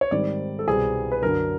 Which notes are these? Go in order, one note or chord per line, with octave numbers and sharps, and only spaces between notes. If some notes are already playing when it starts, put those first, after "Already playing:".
C#5
G#2 D#3 G3 C4 D5
A4
C2 B2 G3 C4 G#4
B4
F#2 D3 F#3 A#4